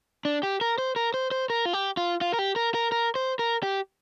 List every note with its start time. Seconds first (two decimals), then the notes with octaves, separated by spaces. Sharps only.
0.25 D4
0.43 G4
0.61 A#4
0.78 C5
0.96 A#4
1.14 C5
1.31 C5
1.50 A#4
1.65 F4
1.73 G4
1.97 F4
2.21 F4
2.34 A#4
2.39 G4
2.56 A#4
2.74 A#4
2.92 A#4
3.15 C5
3.39 A#4
3.63 G4